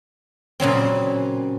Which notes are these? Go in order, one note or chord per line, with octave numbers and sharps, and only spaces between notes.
A#2 C#3 F#3 C4